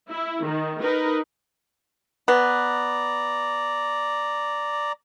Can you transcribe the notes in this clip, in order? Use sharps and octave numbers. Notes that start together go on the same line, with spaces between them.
E4
D#3
D#4 A#4 B4
B3 D5 A#5